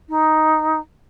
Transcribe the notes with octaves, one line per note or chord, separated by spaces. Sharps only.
D#4